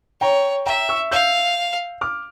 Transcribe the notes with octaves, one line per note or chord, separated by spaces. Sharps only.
C#5 G5 A#5
E5 G5 A#5
C#6 E6
F5 E6 G6
D6 F6